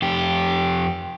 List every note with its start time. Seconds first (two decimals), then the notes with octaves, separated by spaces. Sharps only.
0.02 F2 G4